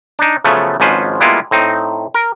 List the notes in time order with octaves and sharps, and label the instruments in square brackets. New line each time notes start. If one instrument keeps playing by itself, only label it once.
[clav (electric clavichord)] D4 D#4
C#3 F3 F#3 A3 B3
G#1 G#2 F3 C#4 B4 C5
G3 G#3 A#3 B3 E4 F4
A2 C4 D#4
A#4